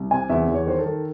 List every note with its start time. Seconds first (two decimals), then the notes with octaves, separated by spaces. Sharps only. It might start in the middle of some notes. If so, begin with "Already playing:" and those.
Already playing: C2
0.11 C3 G#5
0.30 E2 E5
0.48 E2
0.54 C#5
0.67 D#3 C5
0.79 A4
0.85 D#3